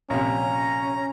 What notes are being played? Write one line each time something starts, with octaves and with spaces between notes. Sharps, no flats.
A#1 C3 C#4 A#5